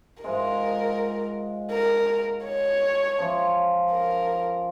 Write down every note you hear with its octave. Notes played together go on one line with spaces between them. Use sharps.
G#2 G#3 F4 A#4
A#4
C#5
F3 C#4 F4
A#4